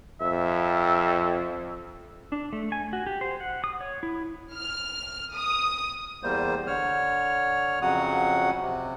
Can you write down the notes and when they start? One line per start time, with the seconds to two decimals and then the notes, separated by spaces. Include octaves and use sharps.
0.21 F2 E5
2.32 D4
2.53 A3
2.72 G#5
2.93 F#4
3.07 G4
3.21 C5
3.41 F#5
3.64 D#6
3.81 C#5
4.03 E4
4.56 F6
5.36 D#6
6.23 E2 G3 A#3 C5
6.67 D3 C#5 F6
7.82 F2 C#3 F#3 F#4 F#5 D#6
8.61 C3